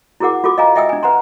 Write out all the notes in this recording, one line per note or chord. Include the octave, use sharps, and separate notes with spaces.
E4 F#4 G#4 A#4 F#5 D6
F4 F#4 A4 D6
D#5 F5 G#5 A#5
D#5 E5 G5 G#5 D#6 E6
D4 G#5
B4 F#5 A#5 C6